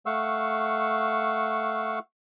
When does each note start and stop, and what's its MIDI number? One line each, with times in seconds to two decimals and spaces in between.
0.06 1.99 57
0.06 1.99 77
0.06 1.99 78
0.06 1.99 85
0.06 1.99 88